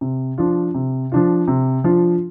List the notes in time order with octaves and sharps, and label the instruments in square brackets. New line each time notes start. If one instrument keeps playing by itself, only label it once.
[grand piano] C3
F3 D4 F4
C3
F3 D4 F4
C3
F3 D4 F4